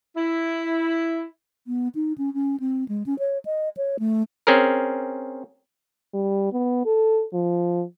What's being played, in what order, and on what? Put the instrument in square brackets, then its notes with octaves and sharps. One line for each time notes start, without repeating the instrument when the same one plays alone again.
[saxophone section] E4
[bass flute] B3
D#4
C#4
C#4
C4
G#3
C#4
C#5
D#5
C#5
A3
[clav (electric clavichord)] C4 C#4 G#4 A#4
[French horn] G3
B3
A4
F3